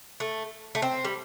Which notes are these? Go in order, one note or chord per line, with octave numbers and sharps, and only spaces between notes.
A3
A3
C4
G3